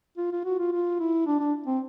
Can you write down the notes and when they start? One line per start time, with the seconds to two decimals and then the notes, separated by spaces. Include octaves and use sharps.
0.17 F4
0.32 F4
0.45 F#4
0.59 F4
0.72 F4
1.00 E4
1.27 D4
1.40 D4
1.67 C4